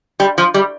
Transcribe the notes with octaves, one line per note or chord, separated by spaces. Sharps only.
G3
F3
G3